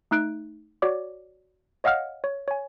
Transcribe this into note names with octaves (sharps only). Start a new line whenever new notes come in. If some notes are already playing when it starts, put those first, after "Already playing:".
A3 D#4 F#6 D7
F#4 C#5 D5 D6
C#5 D#5 F5 F#5 F6
C#5
C#5 G#5